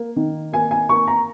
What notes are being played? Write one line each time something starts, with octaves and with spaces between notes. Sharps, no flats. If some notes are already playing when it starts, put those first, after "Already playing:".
Already playing: A#3
D#3
A#3 G#5
G#5
A#3 C#6
A#5